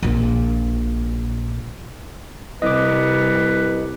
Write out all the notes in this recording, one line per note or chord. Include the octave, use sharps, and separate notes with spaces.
A#1 A#2
C2 C3 G3 B4 D#5 D6